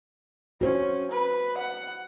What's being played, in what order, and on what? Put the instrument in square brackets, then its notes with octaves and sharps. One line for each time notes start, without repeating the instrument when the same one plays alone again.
[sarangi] C#4 [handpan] F#4 C5
[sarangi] B4
F#5